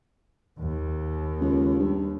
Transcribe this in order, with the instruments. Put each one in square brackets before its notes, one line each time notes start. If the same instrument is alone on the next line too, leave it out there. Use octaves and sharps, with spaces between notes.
[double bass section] D#2
[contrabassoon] C#2
G2